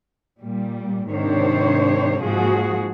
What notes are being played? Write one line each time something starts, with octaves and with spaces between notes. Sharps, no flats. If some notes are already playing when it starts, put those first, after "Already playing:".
A#2 G3
G#2 C3 D#3 D4 C5 C#5
G#2 F3 A#3 F#4 G#4